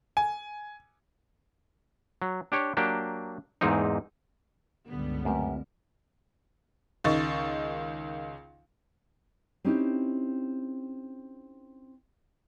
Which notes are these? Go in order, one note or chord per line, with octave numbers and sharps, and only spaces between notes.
G#5
F#3
D4 G4 C#5
F#3 A#3 D4 G4
E2 G#2 A#3 C4 D#4
C#2 G2 D3 G3 B3
F#2 A3 C4 G4 B4
C#2 D#3 D#4 C#6 A6
C4 C#4 D#4 E4 G4